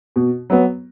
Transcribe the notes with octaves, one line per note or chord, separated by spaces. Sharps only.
B2
F#3 B3